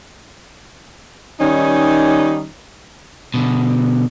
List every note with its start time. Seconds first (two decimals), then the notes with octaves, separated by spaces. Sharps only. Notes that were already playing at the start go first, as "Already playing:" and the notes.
1.40 D#3 G3 C#4 D#4
3.34 B2 D3